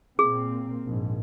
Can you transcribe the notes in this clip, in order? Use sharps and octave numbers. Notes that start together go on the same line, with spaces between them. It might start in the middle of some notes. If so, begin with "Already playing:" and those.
A#2 A#3 C4 G#4
A#1 G#2